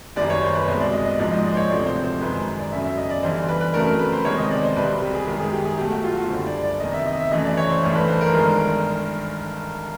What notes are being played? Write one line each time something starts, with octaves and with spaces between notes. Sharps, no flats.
F#1 F#2 D#3 G3 D5
C#5
C5
B4
C2 B2 G#3 C5
D5
D#5
D#5
A#1 G#2 F3 G#3 D5
D#5
D5
C5
C#5
E1 D2 C3 F3 D5
C5
C5
F#2 D#3 G#3 B4
D5
G1 F#2 C#3 F#3 E5
E5
D#5
D5
G1 G2 E3 G3 C5
B4
B4
F2 C#3 F#3 A3 A#4
A#4
B4
C5
E2 C3 D#3 G#3 C#5
D#5
D5
C5
C2 B2 G3 B4
G4
G#4
F#2 D#3 G#3
G#4
G4
G#4
B1 B2 F#3 A3 G4
F#4
F4
F#4
F#1 F#2 D3 G3 C5
D5
D5
E2 C3 D#3 D#5
E5
D#5
E5
F#2 C#3 E3 A3 D#5
D5
C#5
C5
A1 G2 E3 A3
B4
C5
A#4
G1 G2 D#3 G#3